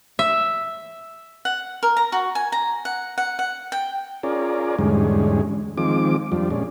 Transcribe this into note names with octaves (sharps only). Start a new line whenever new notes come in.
E5
F#5
A#4
A#5
F#4
G#5
A#5
F#5
F#5
F#5
G5
C#4 F4 G#4 A#4 D5
E2 G#2 D3 G3 G#3 C#4
D#3 F3 G#3 C4 D6
F2 F3 G3 D4
A#2 G#3 C#4 D4